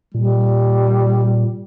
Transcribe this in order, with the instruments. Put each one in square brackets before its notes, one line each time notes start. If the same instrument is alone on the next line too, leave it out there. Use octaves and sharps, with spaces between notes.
[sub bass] A#2 [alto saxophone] G3